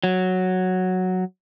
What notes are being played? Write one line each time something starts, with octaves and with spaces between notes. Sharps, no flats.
F#3